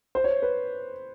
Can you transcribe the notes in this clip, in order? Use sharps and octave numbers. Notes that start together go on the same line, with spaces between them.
C5
C#5
B4